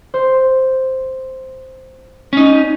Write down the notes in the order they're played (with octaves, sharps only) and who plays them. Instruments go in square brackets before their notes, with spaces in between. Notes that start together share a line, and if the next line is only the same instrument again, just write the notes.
[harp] C5
[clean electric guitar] C#4 D#4